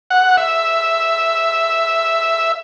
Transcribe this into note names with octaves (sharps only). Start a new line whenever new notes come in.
F#5
E5